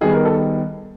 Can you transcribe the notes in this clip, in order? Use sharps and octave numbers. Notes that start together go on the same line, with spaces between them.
D#3 G3 B3 G#4
A#4
A4